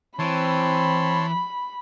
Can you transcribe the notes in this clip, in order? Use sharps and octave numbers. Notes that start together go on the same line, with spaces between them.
E3 C4 C#5 A5 B5 C6